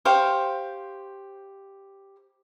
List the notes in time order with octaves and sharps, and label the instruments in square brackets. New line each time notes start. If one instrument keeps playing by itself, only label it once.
[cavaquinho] G4 C5 F5 C#6